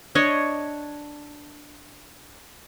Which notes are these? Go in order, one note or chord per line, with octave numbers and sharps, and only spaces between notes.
D4 C#5 D#5